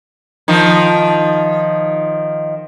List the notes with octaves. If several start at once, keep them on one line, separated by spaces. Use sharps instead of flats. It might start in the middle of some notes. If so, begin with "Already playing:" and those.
D#3 F3